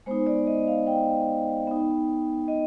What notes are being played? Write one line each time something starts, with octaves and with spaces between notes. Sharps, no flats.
G#3 B3 D#4 C5
D5
D#5
F5
G5
B3 D#4
D#5